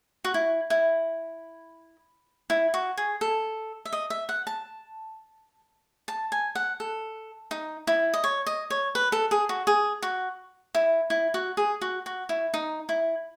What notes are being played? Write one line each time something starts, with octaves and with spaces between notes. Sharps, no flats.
F#4
E4
E4
E4
F#4
G#4
A4
E5
D#5
E5
F#5
A5
A5
G#5
F#5
A4
D#4
E4
D#5
C#5
D#5
C#5
B4
A4
G#4
F#4
G#4
F#4
E4
E4
F#4
G#4
F#4
F#4
E4
D#4
E4